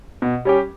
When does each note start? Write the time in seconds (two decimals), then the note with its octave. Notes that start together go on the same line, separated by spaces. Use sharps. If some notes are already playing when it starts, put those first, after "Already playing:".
0.22 B2
0.45 G3 C#4 G4